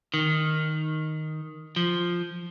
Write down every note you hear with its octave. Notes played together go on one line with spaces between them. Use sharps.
D#3
F3